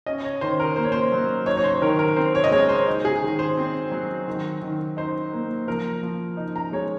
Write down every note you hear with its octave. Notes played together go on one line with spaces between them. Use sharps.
C#4 D#5
C#5
D#3 C5
A#4
A#3 C5
C#5
C5
F#3
D#4 C#5
C#5
C5
D#3 A#4
A#4
C4 C5
C#5
D#5
G#3 C#5
C5
D#4
G#4
D#3
C5
C4
F#3
D#3
D#3
D#4 C5
A#3
F3 A#4
F3
D#4
A#5
G#3 C#5